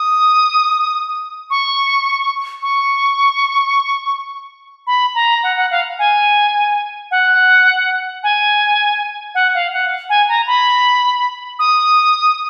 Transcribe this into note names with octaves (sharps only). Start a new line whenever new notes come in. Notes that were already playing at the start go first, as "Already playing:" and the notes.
Already playing: D#6
C#6
C#6
B5
A#5
F#5
F#5
F5
G#5
F#5
G#5
F#5
F5
F#5
G#5
A#5
B5
D#6